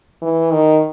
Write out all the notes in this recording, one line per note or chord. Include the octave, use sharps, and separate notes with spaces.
E3
D#3